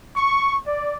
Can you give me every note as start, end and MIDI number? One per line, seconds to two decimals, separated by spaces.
0.17 0.58 85
0.66 0.96 74